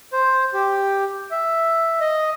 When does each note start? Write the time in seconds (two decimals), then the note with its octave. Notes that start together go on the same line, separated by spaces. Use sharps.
0.13 C5
0.54 G4
1.31 E5
2.00 D#5